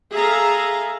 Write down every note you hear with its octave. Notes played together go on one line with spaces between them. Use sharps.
G#4 A4 E5 F5 A#5